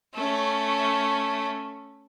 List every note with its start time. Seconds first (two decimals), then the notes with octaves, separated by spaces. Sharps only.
0.14 A3 C#4